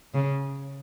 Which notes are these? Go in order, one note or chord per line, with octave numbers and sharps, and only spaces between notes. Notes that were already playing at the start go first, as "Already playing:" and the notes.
C#3